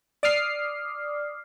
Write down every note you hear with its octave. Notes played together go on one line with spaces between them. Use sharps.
D5 D6 D#6 F6 C7